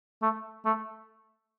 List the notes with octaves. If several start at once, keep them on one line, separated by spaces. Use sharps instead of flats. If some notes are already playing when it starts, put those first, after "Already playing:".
A3
A3